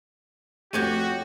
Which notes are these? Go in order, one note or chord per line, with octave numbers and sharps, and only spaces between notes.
F2 A3 F#4 G4 C#5 G5 D#7